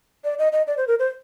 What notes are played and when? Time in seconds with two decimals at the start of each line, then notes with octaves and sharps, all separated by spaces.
0.24 D5
0.39 D#5
0.52 D#5
0.67 D5
0.77 C5
0.88 A#4
0.99 C5